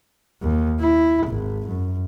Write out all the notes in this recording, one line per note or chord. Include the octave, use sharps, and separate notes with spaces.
D#2
E4
G#1
F#2